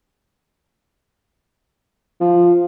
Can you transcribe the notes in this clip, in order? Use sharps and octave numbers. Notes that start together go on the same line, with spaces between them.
F3